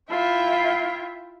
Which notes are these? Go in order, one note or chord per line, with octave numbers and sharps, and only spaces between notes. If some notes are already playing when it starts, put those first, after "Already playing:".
E4 F4 E5 G5